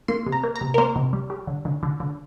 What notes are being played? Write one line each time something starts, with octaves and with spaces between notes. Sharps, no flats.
A#3 C6
C3
A#5
A#3
A#5
C3
A#4
A#3 C5
C3
G3
G3
D3
D3
D3
D3